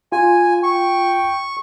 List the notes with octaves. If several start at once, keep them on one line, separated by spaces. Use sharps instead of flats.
F4 G#5
G5 C#6